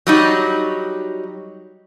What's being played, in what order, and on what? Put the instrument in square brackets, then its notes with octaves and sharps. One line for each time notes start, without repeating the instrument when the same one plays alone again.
[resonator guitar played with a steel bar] F#3 G3 D#4